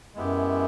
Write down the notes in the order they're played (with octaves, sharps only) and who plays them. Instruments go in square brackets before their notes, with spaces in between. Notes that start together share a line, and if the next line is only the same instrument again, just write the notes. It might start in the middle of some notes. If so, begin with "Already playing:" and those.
[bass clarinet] F#2 [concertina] G#3 B3 E4 G4